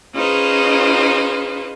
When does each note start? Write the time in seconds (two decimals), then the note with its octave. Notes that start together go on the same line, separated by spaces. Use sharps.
0.14 C#4 D#4 F4 G#4 B4 C5